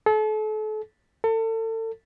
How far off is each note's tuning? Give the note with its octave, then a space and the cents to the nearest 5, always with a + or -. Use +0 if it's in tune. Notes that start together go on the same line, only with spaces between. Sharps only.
A4 -35
A4 +35